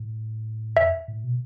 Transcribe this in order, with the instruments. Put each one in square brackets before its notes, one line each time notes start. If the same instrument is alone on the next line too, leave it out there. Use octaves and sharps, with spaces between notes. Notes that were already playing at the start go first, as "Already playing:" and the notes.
Already playing: [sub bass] A2
[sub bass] F2 [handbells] E5
[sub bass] A2
B2